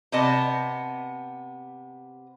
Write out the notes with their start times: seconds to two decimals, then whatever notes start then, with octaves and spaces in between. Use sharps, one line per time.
0.12 C3 B3 D#5 A5